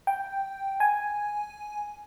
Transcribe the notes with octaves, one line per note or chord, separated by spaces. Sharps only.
G5
G#5